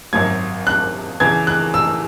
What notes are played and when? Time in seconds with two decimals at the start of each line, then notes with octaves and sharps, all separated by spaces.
0.13 G#1 F#2 F#3 G#6
0.67 F#6
1.20 E2 C#3 E3 G#6
1.47 F#6
1.74 E6